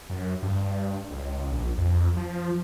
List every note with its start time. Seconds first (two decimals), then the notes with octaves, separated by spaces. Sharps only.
0.10 F#2
0.42 G2
1.11 C#2
1.52 A#1
1.78 F2
2.17 F3